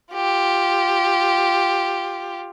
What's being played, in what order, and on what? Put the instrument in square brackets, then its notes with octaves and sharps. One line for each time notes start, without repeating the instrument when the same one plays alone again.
[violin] F4 G4